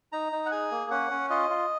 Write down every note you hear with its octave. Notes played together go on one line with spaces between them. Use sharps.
D#4 A#5
D#4
F#5
G#4 G#5
A#3
C#4 F#5
C#4
F4 D#5
F4